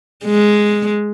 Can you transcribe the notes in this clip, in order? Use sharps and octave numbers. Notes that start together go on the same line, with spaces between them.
G#3